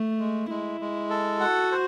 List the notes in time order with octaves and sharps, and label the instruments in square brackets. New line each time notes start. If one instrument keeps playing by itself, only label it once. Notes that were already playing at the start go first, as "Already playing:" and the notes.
Already playing: [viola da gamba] A3
[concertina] G#3
[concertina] G#3 [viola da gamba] E4
[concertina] G#3
A4
[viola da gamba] F#4 [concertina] F#5
[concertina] C5